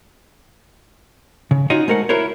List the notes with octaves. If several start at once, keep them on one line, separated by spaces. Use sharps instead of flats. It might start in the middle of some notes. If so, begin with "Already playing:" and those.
C#3
C#4 D#4 F4 F#4 C#5 D#5
G#3 A3 A#4 C5 F#5
E4 F#4 A#4 C5 C#5